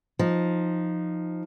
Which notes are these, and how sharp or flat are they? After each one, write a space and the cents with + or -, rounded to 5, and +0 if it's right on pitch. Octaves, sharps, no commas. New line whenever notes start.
F3 +5 D#4 +0